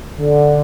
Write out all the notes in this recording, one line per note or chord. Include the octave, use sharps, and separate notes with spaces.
D3